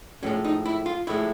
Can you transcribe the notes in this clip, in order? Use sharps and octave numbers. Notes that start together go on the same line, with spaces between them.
A2 F3 G#3 C#4
D#4
E4
F4
A2 F3 G#3 E4